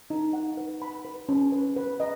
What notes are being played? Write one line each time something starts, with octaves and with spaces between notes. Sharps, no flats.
D#4
F#5
B4
B5
B4
C#4
B4
B4
D#5